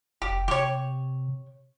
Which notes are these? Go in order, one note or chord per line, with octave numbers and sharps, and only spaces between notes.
F1 G4
C3 G4 C#5